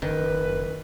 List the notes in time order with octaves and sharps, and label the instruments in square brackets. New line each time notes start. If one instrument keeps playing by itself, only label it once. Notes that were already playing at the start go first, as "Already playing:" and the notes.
[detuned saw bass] F#1 [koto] D#3 [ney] A#4 [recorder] B4